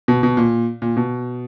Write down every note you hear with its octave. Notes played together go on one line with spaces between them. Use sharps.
B2
B2
A#2
A#2
B2